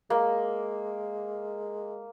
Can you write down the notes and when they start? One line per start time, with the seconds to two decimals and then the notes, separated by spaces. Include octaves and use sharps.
0.10 G#3 A#3